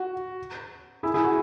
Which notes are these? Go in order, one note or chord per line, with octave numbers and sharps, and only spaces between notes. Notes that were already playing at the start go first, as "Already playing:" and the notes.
Already playing: F#4
E4 G#4
E4 G#4
F#4